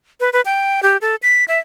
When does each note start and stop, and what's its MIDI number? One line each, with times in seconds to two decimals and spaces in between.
0.20 0.30 71
0.33 0.41 71
0.45 0.80 79
0.83 0.97 67
1.01 1.16 69
1.23 1.44 95
1.48 1.59 76